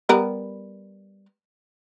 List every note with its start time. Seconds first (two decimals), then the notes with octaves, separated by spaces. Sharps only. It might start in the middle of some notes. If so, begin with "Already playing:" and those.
0.09 G3 B3 A#4